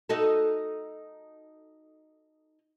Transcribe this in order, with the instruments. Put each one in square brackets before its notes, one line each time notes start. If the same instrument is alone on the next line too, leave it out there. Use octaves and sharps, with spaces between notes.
[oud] D#4 F#4 A4